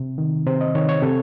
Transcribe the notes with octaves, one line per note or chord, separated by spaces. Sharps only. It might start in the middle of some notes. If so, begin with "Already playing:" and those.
Already playing: C3
D#3
C3 C5
D#5
D#3 C#5
C#5
C3 A4